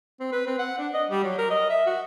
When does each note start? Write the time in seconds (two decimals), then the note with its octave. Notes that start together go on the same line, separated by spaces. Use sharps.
0.20 C4
0.32 B4
0.46 C4
0.59 F#5
0.78 D4
0.94 D#5
1.10 G3
1.24 F#3
1.38 A#4
1.50 D#5
1.69 E5
1.86 F#4